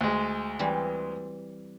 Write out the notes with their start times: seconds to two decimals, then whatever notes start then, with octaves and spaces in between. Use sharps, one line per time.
0.01 D2 G#3
0.59 E3 G3 C4